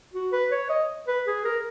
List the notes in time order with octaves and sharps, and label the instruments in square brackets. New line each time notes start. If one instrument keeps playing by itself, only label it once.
[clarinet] F#4
B4
C#5
D#5
B4
G#4
A#4